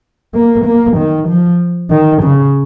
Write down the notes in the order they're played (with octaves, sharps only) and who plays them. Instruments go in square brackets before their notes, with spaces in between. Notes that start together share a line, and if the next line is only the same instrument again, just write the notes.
[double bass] A#3
A#3
D#3
F3
D#3
C#3